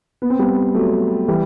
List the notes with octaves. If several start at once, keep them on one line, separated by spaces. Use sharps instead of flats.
B3
C4
G3 B3
F#3 A3
E3 G3